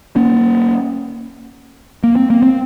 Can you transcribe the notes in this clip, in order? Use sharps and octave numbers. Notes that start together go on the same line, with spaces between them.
A#3 C#4
A#3
C4
A#3
C4